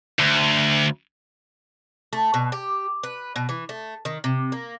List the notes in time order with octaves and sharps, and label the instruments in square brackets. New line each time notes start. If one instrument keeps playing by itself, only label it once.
[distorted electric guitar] D2
[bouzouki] A3
B2
G4
B4
B2
E3
A3
D#3
C3
A#3